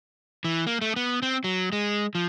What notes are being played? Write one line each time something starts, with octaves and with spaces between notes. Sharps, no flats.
E3
A#3
A3
B3
C4
F#3
G#3
F3